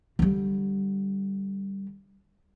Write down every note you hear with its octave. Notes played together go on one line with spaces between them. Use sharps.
D3 G3